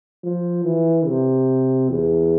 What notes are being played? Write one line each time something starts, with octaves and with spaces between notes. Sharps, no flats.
F3
E3
C3
E2